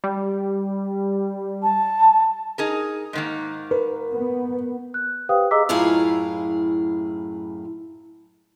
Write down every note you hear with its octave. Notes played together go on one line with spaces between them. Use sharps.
G3
A5
D#4 G#4 A#4
G#2 D#3 A#3
A#4 B4
B3
F#6
G4 B4 C5 F5 G5 D#6
G#4 D#5 A#5 D6 E6 B6
F#2 A2 E4 F4 G#4 F5